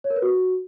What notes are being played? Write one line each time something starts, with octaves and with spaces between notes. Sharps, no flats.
C#5
A#4
B4
F#4